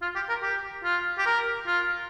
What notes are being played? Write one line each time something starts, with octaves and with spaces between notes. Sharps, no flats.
F4
G4
A#4
G4
F4
G4
A#4
F4